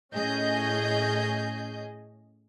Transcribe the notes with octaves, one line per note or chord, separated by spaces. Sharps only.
A2 C#4 G#4 D#5 G6